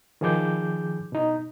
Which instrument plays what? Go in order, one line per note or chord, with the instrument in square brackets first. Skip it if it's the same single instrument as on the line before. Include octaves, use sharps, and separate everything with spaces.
[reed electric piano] D#3 F3 G#4 D6 G6
B2 D#4